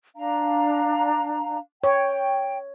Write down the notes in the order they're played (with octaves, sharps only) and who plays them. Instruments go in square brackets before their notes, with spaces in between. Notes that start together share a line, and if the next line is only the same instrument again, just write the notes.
[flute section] D4 F5 A#5
[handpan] C#5 [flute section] G5